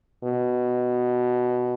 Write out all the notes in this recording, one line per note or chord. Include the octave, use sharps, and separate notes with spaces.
B2